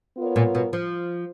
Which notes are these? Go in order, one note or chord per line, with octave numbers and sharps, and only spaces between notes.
B3 F4 A#4 C#5
A#2
B2
F3